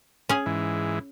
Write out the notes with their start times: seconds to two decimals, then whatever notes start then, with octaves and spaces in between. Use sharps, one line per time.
0.29 C#4 G#4
0.46 G#2 E3